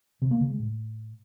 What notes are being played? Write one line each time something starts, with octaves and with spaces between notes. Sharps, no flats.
C3
A#3
C#3
G#3
A2